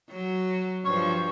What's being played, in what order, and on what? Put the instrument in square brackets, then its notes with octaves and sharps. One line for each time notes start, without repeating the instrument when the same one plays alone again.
[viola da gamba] F#3
[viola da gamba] G2 F3 [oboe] C#5